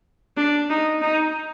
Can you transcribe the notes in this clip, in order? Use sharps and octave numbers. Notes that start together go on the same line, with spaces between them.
D4
D#4
D#4